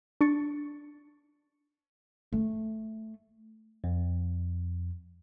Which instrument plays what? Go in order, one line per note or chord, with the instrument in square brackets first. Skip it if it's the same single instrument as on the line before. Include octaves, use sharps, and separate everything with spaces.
[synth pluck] D4 C#6 A6 C#7
[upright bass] A3
[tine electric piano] F2